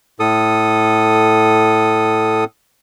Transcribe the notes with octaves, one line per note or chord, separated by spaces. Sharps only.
A2 A4 D#6